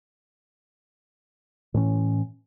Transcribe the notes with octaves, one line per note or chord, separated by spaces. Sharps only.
A2 E3 C#4